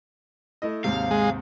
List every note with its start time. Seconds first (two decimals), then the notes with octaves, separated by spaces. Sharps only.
0.62 A3 E4 D#5
0.84 D#2 G#2 C3 F5
1.11 G#3